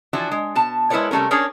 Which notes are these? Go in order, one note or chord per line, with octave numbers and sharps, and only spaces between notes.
E3 F3 D4 F#4
G#3
B2 A5
G#3 E4 A#4 B4 C#5 D5
C3 G3 A3 C#4 A#4
C#4 D4 G#4 A#4 C#5